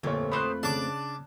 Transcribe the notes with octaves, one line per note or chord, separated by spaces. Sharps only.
G1 F2 A#2 A3 A#3 C#5
B3 C4 C5 B5 C#6 F#6
C#3 D4 A5 D6